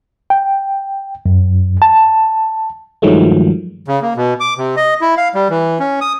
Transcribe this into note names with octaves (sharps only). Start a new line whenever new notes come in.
G5
F#2
A5
G2 D#3 F3 F#3 G#3 A3
C#3
A#3
B2
D6
C3
D#5
E4
F5
G3
E3
C#4
D#6